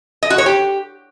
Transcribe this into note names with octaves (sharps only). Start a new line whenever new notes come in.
D#5
F#4
C#5
G4